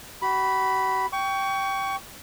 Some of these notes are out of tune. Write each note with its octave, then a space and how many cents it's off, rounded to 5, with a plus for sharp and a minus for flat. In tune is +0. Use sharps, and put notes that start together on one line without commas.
F#4 +45 B5 +0
G5 -5 C#6 +25